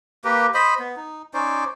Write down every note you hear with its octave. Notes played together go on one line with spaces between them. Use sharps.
A#3 G4 A#4 B4
C5 D#5 B5
B3
D#4
C#4 D#4 C5 D5